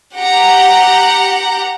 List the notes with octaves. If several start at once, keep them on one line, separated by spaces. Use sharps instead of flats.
G4 F#5 A#5